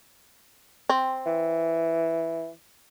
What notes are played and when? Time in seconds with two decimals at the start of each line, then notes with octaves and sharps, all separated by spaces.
0.89 C4
1.26 E3